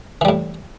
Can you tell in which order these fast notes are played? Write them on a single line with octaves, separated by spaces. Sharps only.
E3 G3 A2